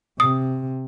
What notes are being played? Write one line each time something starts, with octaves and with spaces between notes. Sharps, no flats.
C3 D#6